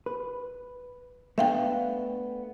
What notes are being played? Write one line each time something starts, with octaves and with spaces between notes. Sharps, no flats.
B4
A3 B3 D4 E5 F5 G5